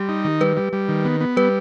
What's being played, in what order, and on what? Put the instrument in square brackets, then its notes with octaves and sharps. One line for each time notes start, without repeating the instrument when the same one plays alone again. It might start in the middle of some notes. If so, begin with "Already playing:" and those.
Already playing: [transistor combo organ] G3 [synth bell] G4
[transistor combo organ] D#4
D#3
[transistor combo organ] G3 [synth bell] B4
[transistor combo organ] G3
G3
D#3
B3
B3
[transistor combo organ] G3 [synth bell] B4